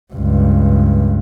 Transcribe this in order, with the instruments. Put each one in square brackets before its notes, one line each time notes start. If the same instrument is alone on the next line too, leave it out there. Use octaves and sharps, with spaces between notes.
[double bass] C#2 G2